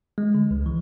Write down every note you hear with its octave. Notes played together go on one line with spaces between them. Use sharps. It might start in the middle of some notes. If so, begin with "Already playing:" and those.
G#3
D3
C#2
E3